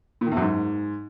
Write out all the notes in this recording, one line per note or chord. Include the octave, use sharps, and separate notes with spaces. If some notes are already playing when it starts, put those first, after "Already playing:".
A#2
D#3
E2
F#2
G#2